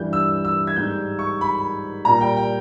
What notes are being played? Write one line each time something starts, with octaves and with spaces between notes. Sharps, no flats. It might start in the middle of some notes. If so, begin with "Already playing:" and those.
Already playing: G2 E3 G3 G6
E6
E6
G#6
G#2 G3 G6
C#6
B5
A#2 G3 A#5
G5
G5